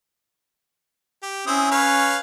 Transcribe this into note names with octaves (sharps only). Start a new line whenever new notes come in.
G4
C4 C#4 E4 D#6
B4 C#5 F5